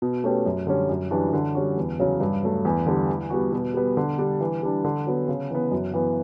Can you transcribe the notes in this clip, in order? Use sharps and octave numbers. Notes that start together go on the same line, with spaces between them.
B2
A3 C#4 G4 B4
F#2
D3 G3 C#4
F#2
E3 G3 D4 F#4
D3
G3 C#4 F#4
E2
C#3 F#3 C#4
G2
F#3 A3
E2
D3 G3
E3
G3 B3 F#4
B2
G3 B3
D3
G3 D4
E3
G3 D4
D3
F#3 B3
C#3
E3 B3
F#2
E3 B3